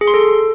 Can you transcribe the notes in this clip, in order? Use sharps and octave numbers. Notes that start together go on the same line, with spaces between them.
G#4
C6
A4